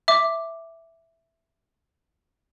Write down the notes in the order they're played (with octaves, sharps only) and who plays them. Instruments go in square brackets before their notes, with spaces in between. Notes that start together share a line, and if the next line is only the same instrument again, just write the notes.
[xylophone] E5 D6